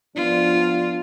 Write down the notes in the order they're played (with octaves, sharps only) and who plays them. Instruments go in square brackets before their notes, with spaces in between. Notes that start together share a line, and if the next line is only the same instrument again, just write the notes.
[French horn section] F3 B3 D4 [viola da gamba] F4